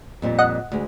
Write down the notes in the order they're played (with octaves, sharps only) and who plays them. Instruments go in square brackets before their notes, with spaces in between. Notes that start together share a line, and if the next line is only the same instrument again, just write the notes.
[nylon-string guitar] F2 A#2 G3
[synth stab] D#5 F#5
[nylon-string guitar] D2 G#3